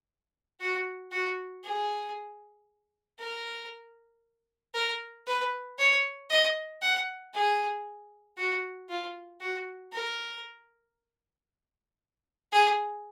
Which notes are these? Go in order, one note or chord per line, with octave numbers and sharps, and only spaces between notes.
F#4
F#4
G#4
A#4
A#4
B4
C#5
D#5
F#5
G#4
F#4
F4
F#4
A#4
G#4